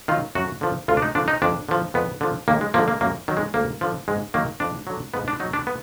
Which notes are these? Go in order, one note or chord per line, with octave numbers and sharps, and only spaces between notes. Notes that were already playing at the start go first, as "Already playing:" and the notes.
D#3 F#3 F4
F#2 F#4
D3 F3
D2 F4
D4
D#4
D3 F3 D4
D#4
F2 D4
D3 F3
F2 B3
D3 F3
D#2 A#3
G#3
D3 F3 A#3
A#3
F#2 A#3
D#3 F#3
G#3
D2 A#3
D3 F3
G#2 G#3
D#3 F#3 A#3
F2 D4
D3 F#3
G#2 B3
D4
F#3 D#4
D4
B3